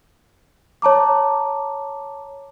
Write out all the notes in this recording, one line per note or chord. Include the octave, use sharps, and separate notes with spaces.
C#5 A5 A#5 D6